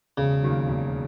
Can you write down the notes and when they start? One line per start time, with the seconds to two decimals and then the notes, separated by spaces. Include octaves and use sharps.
0.17 E1 C#3
0.43 D#2 D#3 F#3
0.68 E1